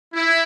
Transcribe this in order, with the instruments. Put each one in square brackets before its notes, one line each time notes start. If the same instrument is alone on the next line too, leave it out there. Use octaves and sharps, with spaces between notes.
[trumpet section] E4